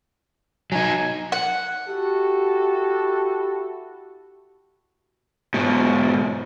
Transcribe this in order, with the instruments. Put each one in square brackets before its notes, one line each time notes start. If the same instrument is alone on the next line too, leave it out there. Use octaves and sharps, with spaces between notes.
[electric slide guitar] F#3 D#4 [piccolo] G#5
[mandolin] F#5
[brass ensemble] E4 F#4 G4 A4
[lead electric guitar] G#2 B2